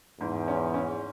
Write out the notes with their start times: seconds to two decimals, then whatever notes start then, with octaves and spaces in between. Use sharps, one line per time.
0.21 E2 G#2
0.48 C#4
0.74 C#4